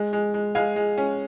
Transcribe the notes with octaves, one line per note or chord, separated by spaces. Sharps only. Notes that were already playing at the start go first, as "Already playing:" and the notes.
Already playing: G#3
G#3
G#3
G#3 F5 G#5
G#3
C#4